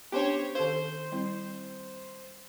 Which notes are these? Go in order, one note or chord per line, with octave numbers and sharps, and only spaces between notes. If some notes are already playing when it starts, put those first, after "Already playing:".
B3 C#4 D4 G4 C5 C#5
D#3 A4 C5 F5
G3 C4 E4